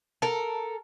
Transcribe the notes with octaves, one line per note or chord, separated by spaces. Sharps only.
A4 A#4